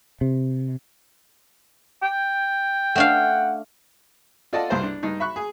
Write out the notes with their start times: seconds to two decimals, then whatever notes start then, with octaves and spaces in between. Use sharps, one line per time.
0.21 C3
2.03 G5
2.95 A3 D4 F5 F#5
4.53 F4 A4 D5 D#5 F#5 A5
4.70 C2 G2 C5
4.83 D4
5.03 G2 D#4
5.20 E5 B5 C#6 F#6
5.36 G#4